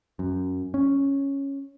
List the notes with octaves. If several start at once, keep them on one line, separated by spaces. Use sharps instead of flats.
F#2
C#4